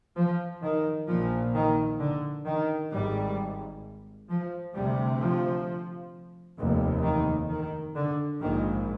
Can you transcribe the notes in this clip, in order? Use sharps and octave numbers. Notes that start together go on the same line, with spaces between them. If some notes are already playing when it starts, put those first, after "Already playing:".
F3
D#3
A#1 A#2 F3
D#3
D3
D#3
G#1 G#2 G3
F3
D2 C3 G3
F3
F1 D#2
D#3
D#3
D3
A#1 G#2 D#3